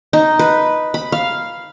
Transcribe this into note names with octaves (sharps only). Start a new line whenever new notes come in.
D#4
B4
B5
F5